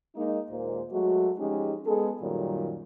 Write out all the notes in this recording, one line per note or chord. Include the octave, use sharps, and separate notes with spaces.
G#3 A#3 D#4
D#2 A#2 G#3 A#3 C5
F#3 G#3 A3 F#4
F3 G#3 C#4 D#4 G4
G#3 B3 G#4 A4
F#2 A#2 D#3 F#3 G3